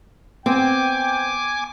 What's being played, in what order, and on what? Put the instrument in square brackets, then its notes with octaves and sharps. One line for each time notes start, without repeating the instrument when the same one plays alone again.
[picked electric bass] B3 [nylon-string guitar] C4 [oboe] G5 [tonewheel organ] G#5 D6